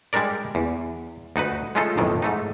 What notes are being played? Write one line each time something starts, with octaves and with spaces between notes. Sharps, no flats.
G3 G#3 D4 A#4 D5
E2
D2 D#4 F#4 B4
G#3 A3 C#4 D#4 F4 A4
B1 F2 A2 D#3 E3
G#2 A3 D#4